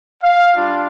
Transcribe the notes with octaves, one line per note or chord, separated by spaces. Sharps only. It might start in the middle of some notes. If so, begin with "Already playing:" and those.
F5
G3 D4 F4